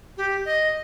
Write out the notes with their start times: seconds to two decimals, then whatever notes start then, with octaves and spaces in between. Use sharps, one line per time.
0.17 G4
0.45 D#5